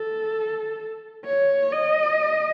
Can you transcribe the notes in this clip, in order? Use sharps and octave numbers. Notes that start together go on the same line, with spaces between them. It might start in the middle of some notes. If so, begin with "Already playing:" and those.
Already playing: A4
C#5
D#5